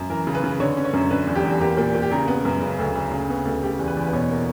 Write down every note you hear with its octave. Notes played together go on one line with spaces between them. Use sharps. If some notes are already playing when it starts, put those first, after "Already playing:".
Already playing: F#2
E3 A#4
C#3
B4
C#3
D3 C#5
C#4
C#5
F#2
D3 B4
E2
G4
E2
A#3 G4
A#2
A#2
G4
C#3 A#4
B3
F#2
C#3
D2
D2
C#3
B3
D2
C#3 G4
E2
B4
E2
B4
B2 C#5
A#3